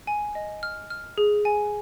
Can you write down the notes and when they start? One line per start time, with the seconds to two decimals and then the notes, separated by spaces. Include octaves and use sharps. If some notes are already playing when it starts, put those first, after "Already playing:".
0.07 G#5
0.35 D#5
0.63 F6
0.90 F6
1.18 G#4
1.45 G#5